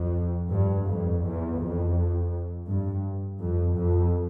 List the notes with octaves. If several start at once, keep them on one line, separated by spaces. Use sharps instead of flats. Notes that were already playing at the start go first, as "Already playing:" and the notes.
Already playing: F2
G2
F2
E2
F2
G2
F2
F2